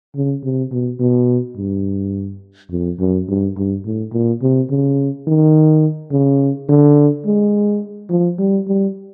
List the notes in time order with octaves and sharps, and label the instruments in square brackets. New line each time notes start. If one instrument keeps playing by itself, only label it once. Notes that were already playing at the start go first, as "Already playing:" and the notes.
[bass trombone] C#3
C3
B2
B2
G2
F2
F#2
G2
G2
A2
A#2
C3
C#3
D#3
C#3
D3
G#3
F3
G3
G3